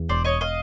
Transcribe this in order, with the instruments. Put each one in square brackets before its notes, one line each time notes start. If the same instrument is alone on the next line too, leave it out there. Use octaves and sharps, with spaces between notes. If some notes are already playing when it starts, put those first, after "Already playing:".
Already playing: [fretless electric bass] E2
[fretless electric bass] E1 [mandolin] C5 D5
[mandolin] C#5 D#5
D#5 F5